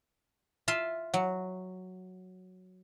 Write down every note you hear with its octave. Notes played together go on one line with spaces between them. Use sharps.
F4 E5 F5 C6
F#3